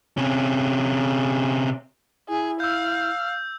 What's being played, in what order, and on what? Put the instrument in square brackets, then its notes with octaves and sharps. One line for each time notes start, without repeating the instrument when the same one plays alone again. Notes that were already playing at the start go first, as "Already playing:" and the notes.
[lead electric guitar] C3 C#4
[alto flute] E4 [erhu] G#4
[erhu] F5 [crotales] E6 G6